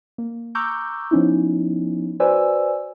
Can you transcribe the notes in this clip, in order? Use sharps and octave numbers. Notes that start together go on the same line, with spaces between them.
A#3
A#5 C#6 D6 E6 F#6 G6
F3 B3 C#4 D#4 E4
F#4 B4 C5 D5 G#5 E6